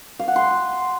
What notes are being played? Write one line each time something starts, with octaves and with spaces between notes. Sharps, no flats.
F5
F#5
C6